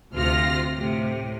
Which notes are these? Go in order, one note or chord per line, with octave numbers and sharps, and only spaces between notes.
D2 C3 F4 F6 A#6
A2 C3